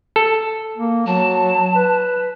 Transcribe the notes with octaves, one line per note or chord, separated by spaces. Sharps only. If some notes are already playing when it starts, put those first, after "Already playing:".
A4
A#3
F#3 A5
B4